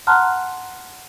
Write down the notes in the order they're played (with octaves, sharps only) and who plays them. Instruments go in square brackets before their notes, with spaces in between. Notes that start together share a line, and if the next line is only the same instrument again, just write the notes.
[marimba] F#5 A5 A#5 C6 F6 F#6